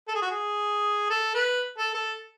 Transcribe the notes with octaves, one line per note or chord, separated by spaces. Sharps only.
A4
G#4
F#4
G#4
A4
B4
A4
A4